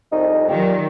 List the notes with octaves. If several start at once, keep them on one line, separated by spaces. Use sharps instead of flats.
C2 F2 D#4
A#2 D#3 F#3 G4